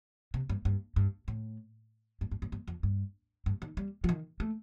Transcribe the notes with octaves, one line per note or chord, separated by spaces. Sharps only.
C3
G2
G2
G2
A2
G2
G2
G2
G2
F2
G2
G2
D#3
G3
F3
D#3
A3